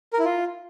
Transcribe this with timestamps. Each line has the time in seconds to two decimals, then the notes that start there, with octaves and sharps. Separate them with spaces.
0.13 A#4
0.19 E4
0.25 F4